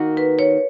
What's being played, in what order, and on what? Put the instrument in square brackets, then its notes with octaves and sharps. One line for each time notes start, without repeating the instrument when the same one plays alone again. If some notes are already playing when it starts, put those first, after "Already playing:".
Already playing: [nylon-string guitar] D#3 A#3 D#4 F#4
[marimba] B4
C#5